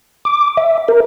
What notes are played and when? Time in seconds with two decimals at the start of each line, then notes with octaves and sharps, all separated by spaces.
0.25 D6
0.57 E5
0.88 A#4